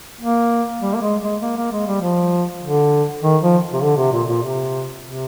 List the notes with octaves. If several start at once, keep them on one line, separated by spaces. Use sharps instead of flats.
A#3
G3
A#3
G#3
G#3
A#3
A#3
G#3
G3
F3
D3
D#3
F3
C3
D3
C3
A#2
A#2
C3
C3